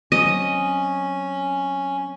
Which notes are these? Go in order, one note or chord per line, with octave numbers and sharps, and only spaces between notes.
F#3 C4 C#4 D#5